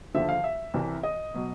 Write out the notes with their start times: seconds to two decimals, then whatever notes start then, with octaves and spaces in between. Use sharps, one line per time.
0.14 D#2 D3 F3 E5
0.29 F5
0.44 E5
0.74 C2 C3 E3
1.03 D#5
1.34 B2 F#3